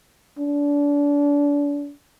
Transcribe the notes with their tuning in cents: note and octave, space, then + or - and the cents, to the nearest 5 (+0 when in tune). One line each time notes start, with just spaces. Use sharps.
D4 -30